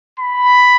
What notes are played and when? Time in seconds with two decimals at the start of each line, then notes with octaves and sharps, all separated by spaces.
0.20 B5